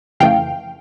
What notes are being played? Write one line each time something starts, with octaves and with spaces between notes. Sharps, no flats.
F2 C#3 E3 A3 F5 G5